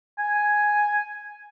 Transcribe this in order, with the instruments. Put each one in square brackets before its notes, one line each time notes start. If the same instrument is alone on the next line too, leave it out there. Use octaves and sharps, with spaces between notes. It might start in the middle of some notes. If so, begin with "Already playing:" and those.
[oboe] G#5